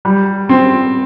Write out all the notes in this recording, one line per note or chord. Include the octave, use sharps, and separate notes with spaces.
G3
C4